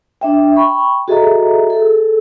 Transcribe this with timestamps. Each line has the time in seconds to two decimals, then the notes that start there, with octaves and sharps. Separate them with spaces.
0.21 D4 E5 G5
0.56 G5 B5 C#6
1.08 F#4 G#4 A4 D#5 E5 A#5
1.70 G#4 A4